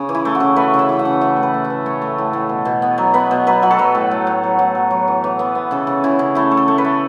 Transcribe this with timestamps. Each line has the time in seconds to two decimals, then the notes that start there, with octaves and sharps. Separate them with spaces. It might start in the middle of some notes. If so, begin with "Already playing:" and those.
Already playing: C#3
0.09 E3
0.15 E4
0.25 A3
0.35 F#4
0.40 C#3
0.56 A3 B4
0.74 C#3
0.79 E5
0.89 E3
0.99 F#5
1.05 C#3
1.21 E3 E5
1.37 A2
1.43 B4
1.54 A3
1.64 E5
1.70 E3
1.86 A3 C#5
2.02 A3
2.18 A2
2.33 A2
2.49 B2
2.65 B2
2.82 B3
2.98 F#3
3.14 B3 B4
3.31 B2
3.47 F#3 B4
3.62 F#3 F#4
3.71 A4
3.78 F#3 B4
3.95 A2
4.11 A3
4.27 A2
4.43 F#3
4.59 A2
4.75 F#3
4.91 F#3
5.08 E3
5.24 E3
5.39 B3
5.55 B3
5.71 C#3 A4
5.87 C#3
6.04 C#3 E4
6.19 C#3
6.35 A3 E4
6.51 A3
6.57 A4
6.68 A3
6.78 B4
6.85 A3